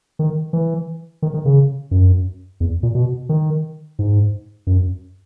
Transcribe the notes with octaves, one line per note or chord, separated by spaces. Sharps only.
D#3
E3
D#3
D#3
C#3
F#2
E2
A#2
B2
D#3
G#2
F#2